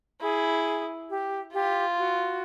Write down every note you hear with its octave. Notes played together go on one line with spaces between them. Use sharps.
E4 G#4
G4
F4 G4
F#4